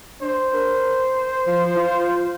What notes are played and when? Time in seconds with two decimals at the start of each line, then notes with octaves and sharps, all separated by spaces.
0.22 D4 C5
0.54 A#4
1.47 F3
1.77 F4